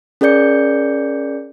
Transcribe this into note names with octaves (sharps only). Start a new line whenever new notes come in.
C#4 G#4 A#4 D5 G6 C#7